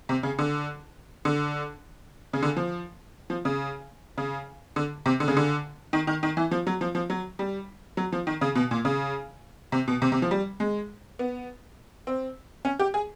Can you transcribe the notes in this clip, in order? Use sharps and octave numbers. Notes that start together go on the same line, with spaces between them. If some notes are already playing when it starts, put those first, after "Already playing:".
C3
C#3
D3
D3
C#3
D3
F3
F3
C#3
C#3
D3
C3
D3
C#3
D3
D#3
D#3
D#3
E3
F3
F#3
F3
F3
F#3
G3
F#3
F3
D#3
C#3
B2
A#2
C#3
C3
B2
C3
C3
F3
G3
G#3
B3
C4
C#4
G4
G#4